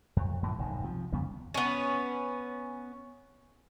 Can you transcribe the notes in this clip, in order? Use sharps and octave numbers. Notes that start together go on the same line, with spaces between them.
F2
F#2 A2 D3 F3
F1 B1 G#2 D#3
C3 F3
F2 C#3 G3 B3
B3 C#4